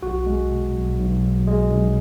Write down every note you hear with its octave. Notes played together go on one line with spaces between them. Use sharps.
B1 F#4
G#3
B2
B1
B1
B1
G#3
B1